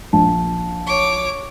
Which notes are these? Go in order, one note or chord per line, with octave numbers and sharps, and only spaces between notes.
A#1 A5
C#5 D6